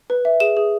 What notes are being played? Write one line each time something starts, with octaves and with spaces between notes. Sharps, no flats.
B4
E5
G#4 E7
G#4